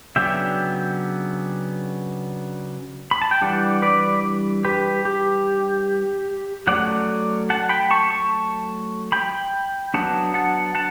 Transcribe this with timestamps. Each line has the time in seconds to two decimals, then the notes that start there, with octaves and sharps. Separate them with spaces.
0.16 C#3 F#3 B3 D4 E5 G5
3.11 B5
3.22 A5
3.31 G5
3.41 E3 G3 D4 D5 F#5
3.82 B4 D5
4.64 G4 B4
5.05 G4
6.67 F#3 A3 C#4 D5 F#5
7.50 F#5 A5
7.69 G5 B5
7.91 A5 C#6
8.10 A5 C#6
9.12 G5 B5
9.94 F#3 B3 D4 F#5 A5
10.34 F#5 A5
10.75 F#5 A5